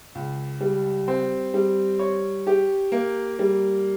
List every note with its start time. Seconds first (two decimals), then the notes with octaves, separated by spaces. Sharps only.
0.15 C#2
0.61 G3
1.08 C4
1.54 G3
1.99 C#5
2.47 G4
2.92 A#3
3.39 G3